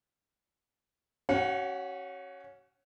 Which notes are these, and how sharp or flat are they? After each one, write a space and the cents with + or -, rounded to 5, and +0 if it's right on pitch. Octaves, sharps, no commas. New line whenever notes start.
C#4 +0 F#4 +35 F#5 -35